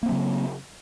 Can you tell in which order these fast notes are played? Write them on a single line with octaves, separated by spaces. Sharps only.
A#3 C4 F#3 C#3